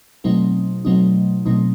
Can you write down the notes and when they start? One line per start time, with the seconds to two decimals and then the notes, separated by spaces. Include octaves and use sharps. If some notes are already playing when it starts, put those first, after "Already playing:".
0.24 B2 F#3 A3 C4 D#4
0.85 B2 F#3 A3 C4 D#4
1.45 B2 F#3 A3 C4 D#4